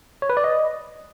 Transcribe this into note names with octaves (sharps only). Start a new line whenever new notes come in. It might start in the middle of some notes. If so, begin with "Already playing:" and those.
C#5
B4
D5
D#5